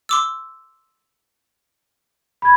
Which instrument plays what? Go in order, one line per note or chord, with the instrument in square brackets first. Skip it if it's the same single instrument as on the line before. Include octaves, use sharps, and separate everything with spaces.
[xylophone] C6 D6 E6
[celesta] B5 G#6